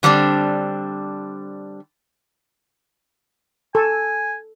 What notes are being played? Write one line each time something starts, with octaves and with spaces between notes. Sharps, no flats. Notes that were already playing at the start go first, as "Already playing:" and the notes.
D3 G3 C4 D4
A4 G#5